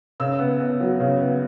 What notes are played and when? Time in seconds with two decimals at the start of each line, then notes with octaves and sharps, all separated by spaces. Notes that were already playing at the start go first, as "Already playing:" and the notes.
0.20 C#3 E6
0.39 B3
0.60 B3
0.80 F#3
1.00 C#3
1.20 B3